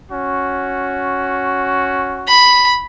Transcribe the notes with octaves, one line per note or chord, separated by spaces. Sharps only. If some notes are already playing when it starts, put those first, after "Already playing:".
C#4 F#4
B5